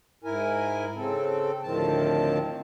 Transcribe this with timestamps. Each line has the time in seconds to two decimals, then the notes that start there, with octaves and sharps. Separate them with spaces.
0.24 G#2 E4 A#4 G#5
0.96 C#3 C4 A4
1.63 D2 A2 D#3 F3 C4 A5